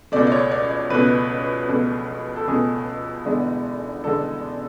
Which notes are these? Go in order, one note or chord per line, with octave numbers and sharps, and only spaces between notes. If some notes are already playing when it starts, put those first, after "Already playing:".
C#2 B2 A3 D5
D5
C#5
D5
D5
C#2 B2 A3 B4
C#2 B2 A3
A4
C#2 B2 A3 G#4
E1 E2 D3 G#3 B3
E1 E2 D3 G#3 B3 A4